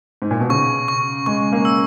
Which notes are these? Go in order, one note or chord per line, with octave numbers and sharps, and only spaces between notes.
G#2
A#2
B2
C#3 C#6
C#6
G#3 C#6
A#3
E6